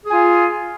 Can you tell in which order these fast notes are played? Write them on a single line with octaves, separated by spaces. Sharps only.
G#4 G#5 F4